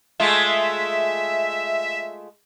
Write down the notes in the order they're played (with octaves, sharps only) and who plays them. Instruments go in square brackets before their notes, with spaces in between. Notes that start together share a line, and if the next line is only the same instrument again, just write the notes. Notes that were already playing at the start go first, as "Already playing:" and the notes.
[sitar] G#3 A3 F4 [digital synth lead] E5